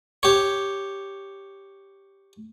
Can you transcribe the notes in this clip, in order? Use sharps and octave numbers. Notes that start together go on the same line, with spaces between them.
G4 C#5